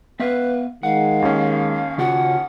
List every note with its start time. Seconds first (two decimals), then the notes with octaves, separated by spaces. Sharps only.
0.20 B3 B4 E5 F5
0.83 D#3 G#3 F5 F#5
1.22 D#2 C#4
1.98 C#3 F4 F#4 F#5